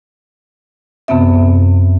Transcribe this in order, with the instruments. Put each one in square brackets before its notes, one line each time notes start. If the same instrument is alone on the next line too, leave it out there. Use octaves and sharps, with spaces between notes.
[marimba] F#2 C3 B3 C4 E5